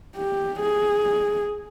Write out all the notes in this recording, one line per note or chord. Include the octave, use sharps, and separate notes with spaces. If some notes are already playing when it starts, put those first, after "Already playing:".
G4
G#4